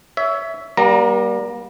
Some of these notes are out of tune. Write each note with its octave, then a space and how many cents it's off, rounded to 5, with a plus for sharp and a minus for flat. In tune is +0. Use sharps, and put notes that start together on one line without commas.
C#5 +25 E5 +0
G3 -10 A#3 +35 A#5 +0